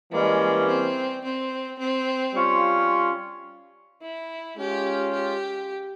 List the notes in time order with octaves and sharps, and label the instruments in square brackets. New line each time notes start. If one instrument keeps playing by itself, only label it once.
[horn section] E3 G3 A#3 C#4 [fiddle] G#3
[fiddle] C4
C4
C4
[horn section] G3 C#4 F4
[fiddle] E4
[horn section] G#3 C#4 F4 [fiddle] G4
[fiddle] G4